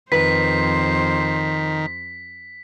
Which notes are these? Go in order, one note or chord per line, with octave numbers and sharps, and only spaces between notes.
F2 D#3 B4 C5 B6